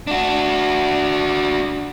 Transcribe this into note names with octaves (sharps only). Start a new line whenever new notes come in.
D4 F#4